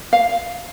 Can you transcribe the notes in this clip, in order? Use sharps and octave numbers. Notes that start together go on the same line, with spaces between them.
F5